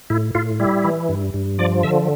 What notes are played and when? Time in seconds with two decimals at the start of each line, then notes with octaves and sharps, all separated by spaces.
0.10 A2 E4
0.35 A2 F4
0.60 G3 E4
0.84 E3
1.09 G2
1.34 G2
1.58 F3 D5
1.83 D3 E5